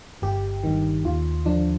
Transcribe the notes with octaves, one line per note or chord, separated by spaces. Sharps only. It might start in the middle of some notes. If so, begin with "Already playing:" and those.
G1 G4
G2 D#3
D#2 F4
D3 F3 D4